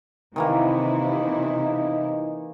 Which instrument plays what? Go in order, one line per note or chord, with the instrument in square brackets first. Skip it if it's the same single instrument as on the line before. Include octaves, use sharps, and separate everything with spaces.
[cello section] C3 E4 [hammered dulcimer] D#3 E3 A#3 [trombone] D#4